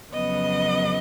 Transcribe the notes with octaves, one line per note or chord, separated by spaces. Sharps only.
F2 C#3 F#3 B3 D#5